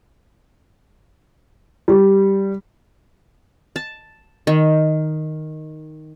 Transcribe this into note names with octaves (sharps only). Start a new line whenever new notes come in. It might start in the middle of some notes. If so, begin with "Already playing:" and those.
G3
A5
D#3